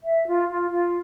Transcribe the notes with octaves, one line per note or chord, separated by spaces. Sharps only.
E5
F4
F4
F4